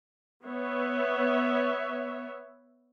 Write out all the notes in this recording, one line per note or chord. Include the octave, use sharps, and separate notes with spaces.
B3 C#5 E5